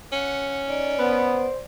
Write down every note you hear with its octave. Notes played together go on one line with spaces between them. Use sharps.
C#4 F#5
D#4 D5
B3 C5